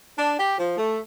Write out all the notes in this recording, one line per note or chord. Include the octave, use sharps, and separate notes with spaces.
D4
G4
F3
A3